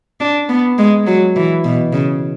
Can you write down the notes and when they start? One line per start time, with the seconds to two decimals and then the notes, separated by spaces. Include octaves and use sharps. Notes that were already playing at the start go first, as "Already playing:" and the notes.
0.21 D4
0.49 B3
0.78 G#3
1.07 F#3
1.36 E3
1.64 B2
1.93 C#3